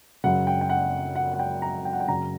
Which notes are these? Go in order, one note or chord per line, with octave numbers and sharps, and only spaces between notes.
F#2 C#3 F#3 F#5
G5
G5
F#5
F#5
F#5
G5
A#5
G5
F#5
G5
F#2 C#3 F#3 A#5